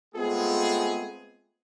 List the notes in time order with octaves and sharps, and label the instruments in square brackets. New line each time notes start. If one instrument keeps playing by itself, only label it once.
[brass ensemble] G#3 A3 B3 C4 F4 G#4